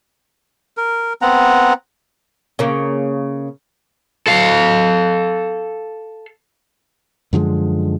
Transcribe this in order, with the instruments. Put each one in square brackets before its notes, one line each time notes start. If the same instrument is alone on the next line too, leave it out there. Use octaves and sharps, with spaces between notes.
[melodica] A#4
B3 C4 F#5 A#5
[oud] C#3 A#3
[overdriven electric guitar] A4 F5
[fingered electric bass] F#2 D3 F3 G#3